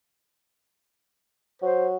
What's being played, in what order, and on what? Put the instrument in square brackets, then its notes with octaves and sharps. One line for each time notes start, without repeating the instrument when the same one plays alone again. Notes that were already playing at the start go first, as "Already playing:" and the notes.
[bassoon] F#3 [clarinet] C5